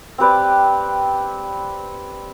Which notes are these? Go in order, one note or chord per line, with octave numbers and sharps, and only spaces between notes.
C4 G4 B4 D5